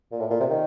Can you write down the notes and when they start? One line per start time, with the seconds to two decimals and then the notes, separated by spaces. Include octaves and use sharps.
0.12 A#2
0.20 A2
0.30 A#2
0.40 C3
0.50 D#3